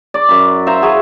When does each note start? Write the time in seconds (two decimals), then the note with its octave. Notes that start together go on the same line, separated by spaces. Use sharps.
0.14 D5
0.29 F#2 B5
0.67 C5 E5 F5 A#5
0.82 F#4 G#4 B4